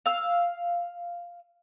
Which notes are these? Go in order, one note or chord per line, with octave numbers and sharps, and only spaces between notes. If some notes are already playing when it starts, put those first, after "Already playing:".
F5 E6